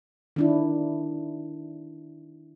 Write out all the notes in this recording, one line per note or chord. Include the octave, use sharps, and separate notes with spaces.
D#3 D4 E4